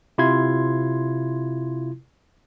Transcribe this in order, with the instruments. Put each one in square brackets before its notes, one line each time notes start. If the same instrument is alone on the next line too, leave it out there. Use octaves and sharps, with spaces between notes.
[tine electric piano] C3 E4 F4 C6 G#6